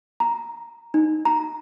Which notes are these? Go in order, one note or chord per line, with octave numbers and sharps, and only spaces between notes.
A#5
D#4
A#5